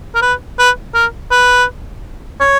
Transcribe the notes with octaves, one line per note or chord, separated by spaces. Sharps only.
A#4
B4
B4
A#4
B4
C#5